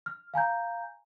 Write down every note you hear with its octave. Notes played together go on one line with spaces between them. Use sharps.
F6
F5 G#5 A#5 G6